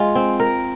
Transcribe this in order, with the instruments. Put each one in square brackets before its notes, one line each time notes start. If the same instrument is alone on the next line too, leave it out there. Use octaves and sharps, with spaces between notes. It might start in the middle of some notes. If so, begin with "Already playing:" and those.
Already playing: [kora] G#3 F4 [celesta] G#5 C6
[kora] C4
A#4